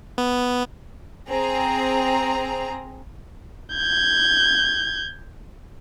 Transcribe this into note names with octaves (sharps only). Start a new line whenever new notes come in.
B3
C4 G#4 A#5
G6 G#6